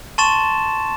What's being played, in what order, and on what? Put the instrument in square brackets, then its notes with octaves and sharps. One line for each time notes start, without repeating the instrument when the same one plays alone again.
[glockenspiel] A5 C6 C#6 A6 E7